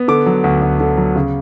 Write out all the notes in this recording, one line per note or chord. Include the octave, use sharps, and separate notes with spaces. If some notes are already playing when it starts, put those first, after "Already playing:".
Already playing: B3
D3 D6
F#3
D2
D2
D3
F#3
C#3